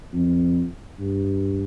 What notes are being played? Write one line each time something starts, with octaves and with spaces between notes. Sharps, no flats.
F2
G2